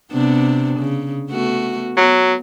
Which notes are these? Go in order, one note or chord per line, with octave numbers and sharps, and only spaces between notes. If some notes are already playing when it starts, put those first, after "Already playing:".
C3 B3 D4
C#3
A3 B3 F#4
F#3 B3